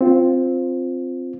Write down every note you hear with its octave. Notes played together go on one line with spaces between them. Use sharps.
C4 F4